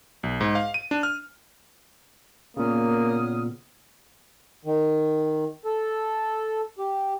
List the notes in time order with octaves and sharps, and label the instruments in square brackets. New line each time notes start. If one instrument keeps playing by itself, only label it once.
[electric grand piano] B1
G#2
F5
D#7
D4
F6
[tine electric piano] A#2 C#3 [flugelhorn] A#3 [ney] B3 [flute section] C#5 D#6 F6
[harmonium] D#3
A4
G4